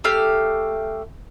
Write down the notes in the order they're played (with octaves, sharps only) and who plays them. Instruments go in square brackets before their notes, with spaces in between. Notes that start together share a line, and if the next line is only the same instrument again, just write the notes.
[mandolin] A3 G4 F5